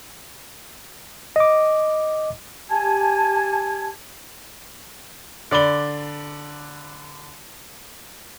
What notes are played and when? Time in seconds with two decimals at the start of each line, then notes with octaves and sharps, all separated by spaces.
1.36 D#5 D6
2.69 G4 G#5 A5 G#6
5.51 D3 D5 B5 G7